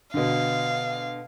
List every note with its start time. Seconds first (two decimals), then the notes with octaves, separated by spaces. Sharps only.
0.14 B2 D3 F5